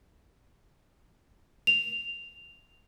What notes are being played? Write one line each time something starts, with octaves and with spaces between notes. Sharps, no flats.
F7